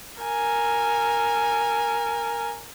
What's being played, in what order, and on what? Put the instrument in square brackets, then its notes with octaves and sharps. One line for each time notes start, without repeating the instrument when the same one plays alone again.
[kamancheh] A#4 G#5